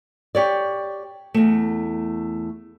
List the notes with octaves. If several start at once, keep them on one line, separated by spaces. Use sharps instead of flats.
G4 C#5 D5
E2 A3